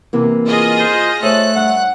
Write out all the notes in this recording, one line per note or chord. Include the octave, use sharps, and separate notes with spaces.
C3 E3 A#3
F4 G#4 D#5
C5
A3 A4 C5 C#5 F#6
G2 F#5